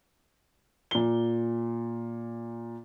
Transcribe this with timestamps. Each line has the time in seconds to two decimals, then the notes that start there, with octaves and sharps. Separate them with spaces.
0.91 A#2 G7